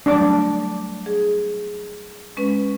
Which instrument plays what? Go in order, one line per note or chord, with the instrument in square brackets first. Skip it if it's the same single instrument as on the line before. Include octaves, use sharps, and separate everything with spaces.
[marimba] F#3 G3 A3 [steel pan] D4 D6
[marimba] G#4
G#3 C#4 B4